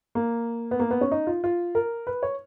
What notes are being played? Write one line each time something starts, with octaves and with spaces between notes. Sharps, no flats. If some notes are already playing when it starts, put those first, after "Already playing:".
A#3
B3
A#3
B3
C#4
D#4
F4
F4
A#4
B4
C#5